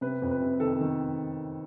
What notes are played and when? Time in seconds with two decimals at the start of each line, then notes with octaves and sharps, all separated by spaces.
0.01 C3 B4
0.22 F2
0.31 B4
0.41 C3
0.60 D#3 A4
0.80 D#3